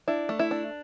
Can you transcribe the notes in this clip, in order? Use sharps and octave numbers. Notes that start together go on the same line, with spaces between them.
D4 E4
A3
E4
D4